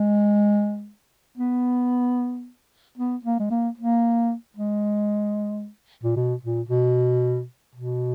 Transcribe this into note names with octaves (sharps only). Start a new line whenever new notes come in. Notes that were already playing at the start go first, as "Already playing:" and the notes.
Already playing: G#3
B3
B3
A#3
G#3
A#3
A#3
G#3
A#2
B2
A#2
B2
B2